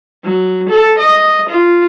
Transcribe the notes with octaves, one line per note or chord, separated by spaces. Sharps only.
F#3
A4
D#5
F4